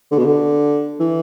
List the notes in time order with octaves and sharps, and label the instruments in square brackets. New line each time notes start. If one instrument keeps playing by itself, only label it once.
[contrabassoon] D3
B2
D3
E3